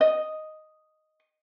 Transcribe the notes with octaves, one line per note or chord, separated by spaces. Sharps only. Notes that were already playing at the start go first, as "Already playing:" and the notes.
D#5